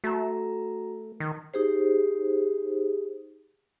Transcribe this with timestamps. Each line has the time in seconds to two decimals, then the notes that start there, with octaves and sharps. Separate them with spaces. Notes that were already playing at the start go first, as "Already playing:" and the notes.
0.04 A3 F#4 A#5
1.20 D#3
1.54 D#4 G4 G#4 C5